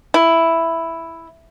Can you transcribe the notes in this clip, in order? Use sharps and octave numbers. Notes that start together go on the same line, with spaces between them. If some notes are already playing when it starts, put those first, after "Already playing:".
E4